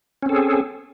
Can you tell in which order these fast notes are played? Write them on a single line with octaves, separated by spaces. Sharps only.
C#4 C4 A4 G#4